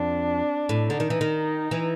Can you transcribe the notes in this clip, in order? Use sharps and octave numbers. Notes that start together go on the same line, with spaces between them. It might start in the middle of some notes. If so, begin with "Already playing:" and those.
Already playing: F2 D4
A2
D3 D#4
D#3
E3
D#3
E3